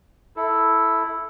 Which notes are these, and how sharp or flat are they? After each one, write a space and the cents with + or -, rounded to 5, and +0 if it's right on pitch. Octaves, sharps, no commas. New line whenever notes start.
E4 +0 A4 +0